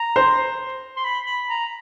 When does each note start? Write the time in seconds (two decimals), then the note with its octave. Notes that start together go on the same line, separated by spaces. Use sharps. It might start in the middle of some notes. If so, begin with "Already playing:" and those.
Already playing: A#5
0.16 C5
0.96 C6
1.04 B5
1.27 B5
1.49 A#5